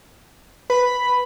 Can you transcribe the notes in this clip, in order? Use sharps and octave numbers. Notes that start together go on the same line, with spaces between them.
B4 B5